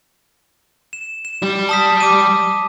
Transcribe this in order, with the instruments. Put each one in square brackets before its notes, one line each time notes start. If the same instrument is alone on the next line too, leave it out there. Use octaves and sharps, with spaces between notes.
[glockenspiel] E7
E7
[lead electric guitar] G3 G4
[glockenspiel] A5 D#6 B6
D6 D#7